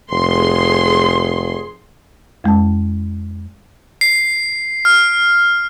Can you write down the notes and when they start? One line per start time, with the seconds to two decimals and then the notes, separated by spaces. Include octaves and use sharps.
0.12 F1 G#4 C6
2.44 F2 G#3 C#4 A5
4.01 C7
4.85 F6